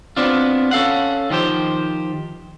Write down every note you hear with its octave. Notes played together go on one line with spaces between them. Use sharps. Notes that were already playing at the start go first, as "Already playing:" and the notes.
B3 C4 D4 F4
C#4 A4 F5 F#5
D#3 F3 G4 C5